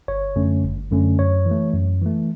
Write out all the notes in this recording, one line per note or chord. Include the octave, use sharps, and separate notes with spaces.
G1 C#5
F#2 D3 A3 C#4
G1
F#2 D3 A3 C#4
F#2 C#5
E3
A3
F#2
E3 A3